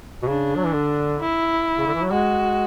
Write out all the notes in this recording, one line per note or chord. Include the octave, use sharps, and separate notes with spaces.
B2
C#3 D4
F#3
E3
D3
E4
C#3
D3
E3
F#3
G#3 F#4